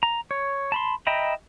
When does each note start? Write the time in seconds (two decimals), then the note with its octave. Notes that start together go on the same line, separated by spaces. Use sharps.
0.03 A#5
0.31 C#5
0.72 A5 B5 C6
1.07 D#5 E5 G5 A#5 B5